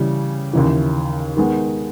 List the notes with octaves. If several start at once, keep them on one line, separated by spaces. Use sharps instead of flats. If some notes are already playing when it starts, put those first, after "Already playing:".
Already playing: C#3 E3 G3
D#2 C#3 E3
D#3 G#3 B3